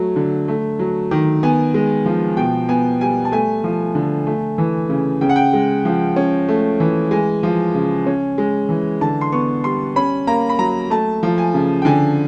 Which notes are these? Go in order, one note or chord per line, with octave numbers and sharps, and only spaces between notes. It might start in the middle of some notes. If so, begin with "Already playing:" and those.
Already playing: F#3 A3
D3
A3
F#3
D#3
B3 G#5
G#3
F3
B2 G5
B3 G#5
G3 G#5
A5
A3 G#5
F3
D3
A3
E3
C#3
C#3 G5
F#5
G5
G#3
F3
C#4
A3
E3
G#3 G#5
F3
C#3
C#4
G#3
E3
D3 A5
C6
B3 C#6
G3 C6
C#4 B5
A#3 A#5
B5
F#3 A#5
A3 A5
F3
G#5
C#3
G5
D3 G#5